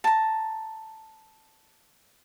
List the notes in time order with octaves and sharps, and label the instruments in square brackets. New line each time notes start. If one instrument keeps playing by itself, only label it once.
[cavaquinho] A5 A#5